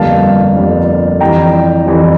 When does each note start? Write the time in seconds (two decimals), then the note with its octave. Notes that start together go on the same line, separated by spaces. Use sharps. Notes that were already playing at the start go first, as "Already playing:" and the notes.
Already playing: G1 F2 D3 G3 A#3 F5 A5
0.55 G1 F2 D3 G3 A#3
1.21 F2 E3 G3 G5 A#5
1.86 F2 E3 G3